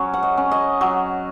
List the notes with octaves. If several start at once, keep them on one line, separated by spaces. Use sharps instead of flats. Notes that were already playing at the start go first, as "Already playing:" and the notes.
Already playing: F#3 C#4 C#5
F#5
D#5
C#4
D#5
F#3